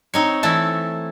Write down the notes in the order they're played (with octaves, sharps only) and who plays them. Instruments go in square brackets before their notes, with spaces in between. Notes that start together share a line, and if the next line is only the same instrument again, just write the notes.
[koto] C4 D#4 C#5
E3 A3 E4 A5